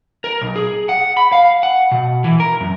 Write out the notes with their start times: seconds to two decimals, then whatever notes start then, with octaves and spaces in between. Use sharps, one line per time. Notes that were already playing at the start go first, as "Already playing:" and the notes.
0.24 A#4
0.41 B1
0.56 G#4
0.89 F#5
1.17 B5
1.32 F5
1.63 F#5
1.91 B2
2.24 E3
2.40 A#4
2.61 F#2